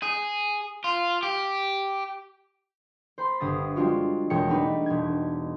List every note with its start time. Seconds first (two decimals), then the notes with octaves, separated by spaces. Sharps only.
0.03 G#4
0.84 F4
1.23 G4
3.18 C5 B5 C6
3.40 G1 D#6 A6
3.76 G3 G#3 D4 F4 F#4
4.30 E1 G#3 A#4 C#5 G5 C#7
4.49 G3 A3 B3 D4 D#4 B4
4.86 E1 G#6